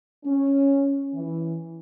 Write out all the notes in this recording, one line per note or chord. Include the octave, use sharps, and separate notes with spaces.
C#4
E3